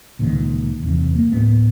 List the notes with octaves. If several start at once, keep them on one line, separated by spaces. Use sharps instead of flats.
C#2 A#2 D#3
F#1 E2 C3
A#3
D1 A2 B3